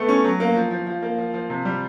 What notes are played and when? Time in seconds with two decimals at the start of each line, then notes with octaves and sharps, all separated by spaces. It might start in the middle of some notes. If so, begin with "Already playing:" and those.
Already playing: A3 B3
0.09 C#4
0.24 F#3
0.40 A#3
0.56 F3
0.71 F3
0.87 F3
1.03 A#3
1.18 F3
1.34 F3
1.50 C3
1.65 G3